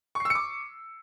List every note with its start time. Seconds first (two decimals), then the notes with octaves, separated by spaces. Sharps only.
0.15 C#6
0.20 C7
0.25 E6
0.30 C#7
0.35 D6